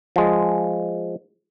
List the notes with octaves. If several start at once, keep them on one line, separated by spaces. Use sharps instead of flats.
F3 G#3